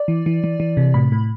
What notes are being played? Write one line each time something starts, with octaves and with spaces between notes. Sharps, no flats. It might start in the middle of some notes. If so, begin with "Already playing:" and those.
Already playing: D5
E3
E3
E3
E3
C3
A2 B5
A2